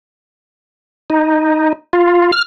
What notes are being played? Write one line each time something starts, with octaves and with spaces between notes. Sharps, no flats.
D#4
F4
F6